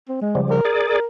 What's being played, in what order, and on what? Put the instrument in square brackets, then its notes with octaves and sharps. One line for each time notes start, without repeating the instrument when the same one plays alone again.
[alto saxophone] C4
G#3
[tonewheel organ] C#3 F3 G3
[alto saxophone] A#4
[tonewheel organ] G#4 D5
[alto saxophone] A#4